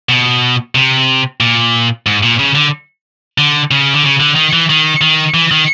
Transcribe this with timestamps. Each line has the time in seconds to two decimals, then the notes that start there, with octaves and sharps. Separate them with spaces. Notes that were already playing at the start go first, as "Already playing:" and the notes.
0.09 B2
0.75 C3
1.40 A#2
2.06 G#2
2.23 A#2
2.39 C#3
2.55 D3
3.38 D3
3.71 C#3
3.94 D3
4.04 C#3
4.20 D3
4.36 D#3
4.53 E3
4.70 D#3
5.01 D#3
5.34 E3
5.51 D#3